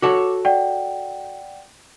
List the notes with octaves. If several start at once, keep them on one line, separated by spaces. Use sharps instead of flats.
F#4 A4 C#5 D6
D5 F#5 G5